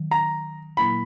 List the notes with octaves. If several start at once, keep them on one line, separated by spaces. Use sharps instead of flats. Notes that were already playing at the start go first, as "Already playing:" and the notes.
Already playing: D#3 F#3
A#5
A#2 F#3 A#3 E4 B5